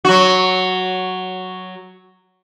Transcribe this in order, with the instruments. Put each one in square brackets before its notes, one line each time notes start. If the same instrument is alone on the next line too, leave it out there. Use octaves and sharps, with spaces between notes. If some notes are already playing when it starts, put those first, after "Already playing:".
[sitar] F#3 F#4